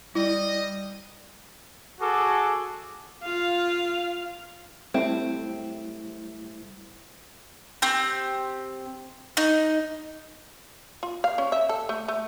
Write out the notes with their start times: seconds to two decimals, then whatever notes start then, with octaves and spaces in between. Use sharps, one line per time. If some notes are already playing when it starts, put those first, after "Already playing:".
0.15 G3 E4 D#5
2.01 F#4 G#4 A4 D6
3.23 F4 F5
4.94 G3 A3 C4 E4
7.82 C4 G4
9.37 D#4
11.03 F4
11.24 F5
11.38 C#4
11.52 E5
11.69 A4
11.89 A3
12.08 A3